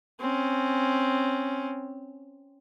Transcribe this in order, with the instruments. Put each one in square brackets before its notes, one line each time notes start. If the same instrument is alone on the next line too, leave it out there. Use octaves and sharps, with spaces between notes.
[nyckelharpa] C4 C#4